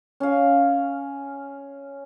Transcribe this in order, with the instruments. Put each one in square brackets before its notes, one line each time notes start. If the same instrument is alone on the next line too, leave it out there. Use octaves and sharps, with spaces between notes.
[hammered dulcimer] C#4 F5